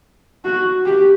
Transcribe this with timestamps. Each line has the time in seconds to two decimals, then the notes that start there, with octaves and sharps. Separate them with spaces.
0.45 F#4
0.86 G4